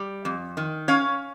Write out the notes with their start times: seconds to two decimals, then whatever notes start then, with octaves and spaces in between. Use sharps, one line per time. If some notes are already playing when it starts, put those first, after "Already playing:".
Already playing: G3
0.25 F2
0.57 D#3
0.88 C#4 C#5 F5